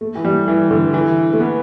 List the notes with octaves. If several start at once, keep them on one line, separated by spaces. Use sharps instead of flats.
A3
E3
G3
E3
D3
E3
A3
B3